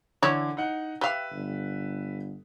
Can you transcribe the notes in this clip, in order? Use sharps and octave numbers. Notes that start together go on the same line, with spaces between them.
D3 E3 E4 C#5
D#4 F#5
G4 B4 E5 F5
G1